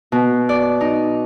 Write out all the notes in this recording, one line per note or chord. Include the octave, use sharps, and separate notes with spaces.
B2
D5
D#4